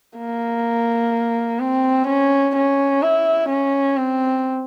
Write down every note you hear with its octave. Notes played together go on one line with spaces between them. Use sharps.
A#3
C4
C#4
C#4
E4
C#4
C4